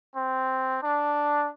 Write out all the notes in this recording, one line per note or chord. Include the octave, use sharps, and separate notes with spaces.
C4
D4